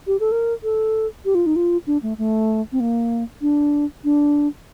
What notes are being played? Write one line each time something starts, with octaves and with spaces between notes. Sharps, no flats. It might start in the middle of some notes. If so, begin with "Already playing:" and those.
G4
A4
A#4
A4
G4
F4
D#4
F4
D4
A3
A3
C4
A#3
D4
D4